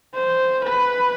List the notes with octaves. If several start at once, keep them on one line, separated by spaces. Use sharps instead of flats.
C5
B4